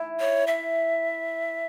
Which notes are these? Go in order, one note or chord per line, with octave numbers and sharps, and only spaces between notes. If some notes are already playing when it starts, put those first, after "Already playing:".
Already playing: E4
C#5
E5